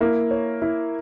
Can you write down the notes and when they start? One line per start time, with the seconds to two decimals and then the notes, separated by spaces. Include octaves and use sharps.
0.01 A#3 E4
0.31 C#5
0.62 E4